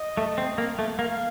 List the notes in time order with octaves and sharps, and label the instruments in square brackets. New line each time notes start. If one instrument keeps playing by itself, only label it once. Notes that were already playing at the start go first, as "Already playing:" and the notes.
Already playing: [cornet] D#5
[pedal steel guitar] A3
C4
A#3
A3
[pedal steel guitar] A#3 [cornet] F5